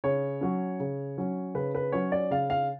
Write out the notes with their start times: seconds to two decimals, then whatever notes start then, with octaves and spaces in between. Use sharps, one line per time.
0.04 C#3 C#5
0.41 F#3 C#4
0.80 C#3
1.18 F#3 C#4
1.54 C#3 B4
1.75 B4
1.92 F#3 C#4 C#5
2.12 D5
2.31 C#3 F5
2.50 F5